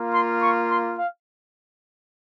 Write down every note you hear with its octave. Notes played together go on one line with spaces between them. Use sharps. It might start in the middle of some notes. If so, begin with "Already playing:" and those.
Already playing: A#3 F4
C6
C#6
C6
F5